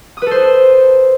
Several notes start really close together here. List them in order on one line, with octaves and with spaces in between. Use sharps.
D#6 B4 A4 C5